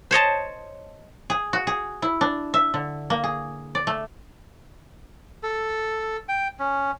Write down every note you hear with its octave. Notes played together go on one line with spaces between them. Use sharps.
C5 C#5 D#5 A5
G#4
F#4
G#4
E4
D4
E5
D3
A#3
G#4
D5
A3
A4
G5
C#4